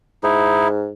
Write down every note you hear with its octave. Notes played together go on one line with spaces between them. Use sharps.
G#2 D#4 E4